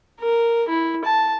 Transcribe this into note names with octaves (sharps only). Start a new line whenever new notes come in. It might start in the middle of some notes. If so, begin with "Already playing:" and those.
A#4
E4
A5